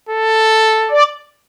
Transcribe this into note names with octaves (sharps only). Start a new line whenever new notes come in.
A4
D5